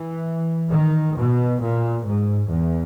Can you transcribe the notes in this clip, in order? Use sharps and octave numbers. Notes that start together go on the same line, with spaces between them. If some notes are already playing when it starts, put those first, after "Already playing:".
Already playing: E3
D#3
B2
A#2
G#2
E2